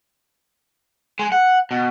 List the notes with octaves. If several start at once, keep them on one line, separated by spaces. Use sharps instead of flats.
G#3
F#5
B2